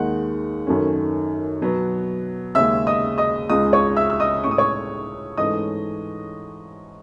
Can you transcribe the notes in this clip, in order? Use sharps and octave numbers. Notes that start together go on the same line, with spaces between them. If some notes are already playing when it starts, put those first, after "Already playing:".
Already playing: D#2 D#3 G#3 D#4 F#5
F#2 D#3 A3 C#4
B2 F#3 B3
D#2 C#3 G#3 C#4 E5 E6
D#5 D#6
D#5 D#6
C#2 C#3 G#3 D#5 D#6
C#5 C#6
E5 E6
E6
D#5 D#6
A2 G#3 C#4 C#6
D#6
C#5 C#6
G#2 E3 A3 C#4 D#5 D#6